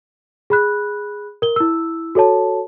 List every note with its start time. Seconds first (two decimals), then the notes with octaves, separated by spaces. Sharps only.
0.50 G#4 B5 F#6
1.42 A#4 G7
1.56 E4 E6
2.15 F#4 A4 C#5 A5